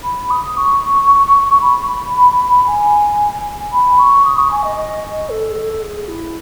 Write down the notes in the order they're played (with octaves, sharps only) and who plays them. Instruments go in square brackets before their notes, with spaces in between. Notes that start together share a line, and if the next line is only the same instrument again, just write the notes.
[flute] B5
D#6
C#6
B5
G#5
B5
C#6
D#6
C#6
G#5
D#5
D#5
D#5
A4
G#4
A4
G#4
E4